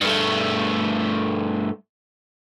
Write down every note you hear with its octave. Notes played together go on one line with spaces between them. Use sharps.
G2 A3